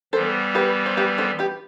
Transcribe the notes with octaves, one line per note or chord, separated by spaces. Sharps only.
E3 G3 B3 A4 C5
G4 B4
C5
G4 B4
A4 C5
G4 B4